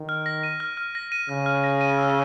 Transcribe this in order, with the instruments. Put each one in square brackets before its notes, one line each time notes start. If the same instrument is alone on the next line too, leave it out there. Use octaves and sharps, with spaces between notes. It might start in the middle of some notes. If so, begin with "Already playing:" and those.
Already playing: [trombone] D#3
[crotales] F6
A#6
D#7
F6
F6
A#6
D#7
[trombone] C#3 [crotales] F6
[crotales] F6
A#6
D#7
E6